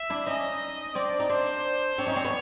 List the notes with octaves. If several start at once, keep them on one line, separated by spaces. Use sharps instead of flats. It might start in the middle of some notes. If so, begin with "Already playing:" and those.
Already playing: E5
D4 E4
C#4 D#4 D#5
C4 D4 D5
D#4
C4 D4 C5
C4 D4 C#5
C#4 D#4
C4 D4
B3 C#4